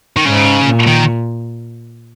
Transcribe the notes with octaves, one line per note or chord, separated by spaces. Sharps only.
D#3
G#2 C#3
A#2
D#3